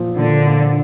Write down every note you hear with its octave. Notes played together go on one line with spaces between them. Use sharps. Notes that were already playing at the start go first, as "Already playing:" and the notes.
Already playing: A#2 F3
A#2 D3
A#2